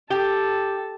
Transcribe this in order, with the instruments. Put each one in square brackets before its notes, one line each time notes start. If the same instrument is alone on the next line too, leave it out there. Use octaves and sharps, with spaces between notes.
[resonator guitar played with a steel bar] G4 [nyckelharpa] A4